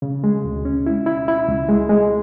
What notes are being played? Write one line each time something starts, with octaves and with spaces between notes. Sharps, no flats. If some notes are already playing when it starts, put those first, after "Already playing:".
C#3
G#3
D2
C#4
E4
E4
E4
C#2
G#3
G#3